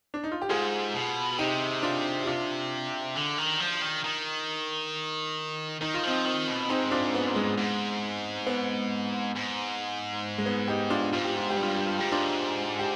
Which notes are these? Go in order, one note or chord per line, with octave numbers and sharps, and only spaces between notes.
D4
D#4
F4
G4
G#2 F4 G#4
B2
C3 D#4 G4
D4 F4
G4
D4 F4
D3
D#3
F3
D#3
D#3
D#3 D#4
F4
F3 C4 D#4
D#3
B2
G#2 C4 D#4
D4 F4
B3
G#3
G#2
B3
G#2
G#3
B3
D#4 G4
D4 F4
G#2 F4
G4
F4
G4
G2
F4
G4
F4
G#2 G4
D4 F4
G4